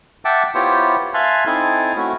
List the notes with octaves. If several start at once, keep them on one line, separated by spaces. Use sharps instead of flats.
E5 F#5 G5 A5 D6
B3 E4 F4 G4 C5 C#5
E5 F5 G#5 A5 C6 F#6
C4 D#4 E4 A4 G#5
A3 C4 C#4 E4 F#4